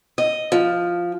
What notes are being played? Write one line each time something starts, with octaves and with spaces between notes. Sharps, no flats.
D#5
F3